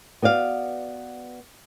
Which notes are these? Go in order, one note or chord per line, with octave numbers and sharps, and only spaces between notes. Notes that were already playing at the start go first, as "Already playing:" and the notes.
B3 F#4 D5 F5